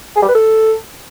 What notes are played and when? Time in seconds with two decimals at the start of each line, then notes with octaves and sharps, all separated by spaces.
0.16 G#4
0.23 G3
0.29 B4
0.35 A4